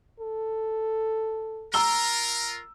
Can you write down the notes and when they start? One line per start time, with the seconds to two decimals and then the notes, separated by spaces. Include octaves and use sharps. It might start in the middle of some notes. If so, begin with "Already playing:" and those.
0.20 A4
1.74 F4 A#4 A#5 E6 G7